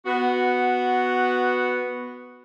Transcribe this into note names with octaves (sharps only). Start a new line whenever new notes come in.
B3 F#4